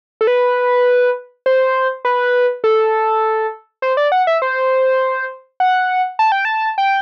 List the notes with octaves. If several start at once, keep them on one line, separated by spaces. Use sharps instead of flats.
A4
B4
C5
B4
A4
C5
D5
F#5
E5
C5
F#5
A5
G5
A5
G5